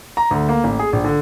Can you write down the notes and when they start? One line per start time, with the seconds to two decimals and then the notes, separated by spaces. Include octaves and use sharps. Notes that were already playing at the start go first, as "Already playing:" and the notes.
0.17 A#5
0.31 D2
0.49 A#3
0.64 A1
0.79 G#4
0.93 A#1
1.04 D3